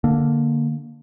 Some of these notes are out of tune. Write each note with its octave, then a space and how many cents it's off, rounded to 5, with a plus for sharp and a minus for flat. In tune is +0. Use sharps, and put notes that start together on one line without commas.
D3 +0 A#3 +0